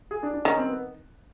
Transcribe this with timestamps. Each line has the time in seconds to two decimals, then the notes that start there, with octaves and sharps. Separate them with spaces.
0.11 G#4
0.23 D4
0.34 D4
0.45 D#3 C#4
0.57 C4
0.69 B3